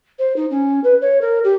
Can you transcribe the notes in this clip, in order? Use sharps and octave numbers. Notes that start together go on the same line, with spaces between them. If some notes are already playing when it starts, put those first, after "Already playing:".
C5
D#4
C#4
B4
C#5
A#4
G4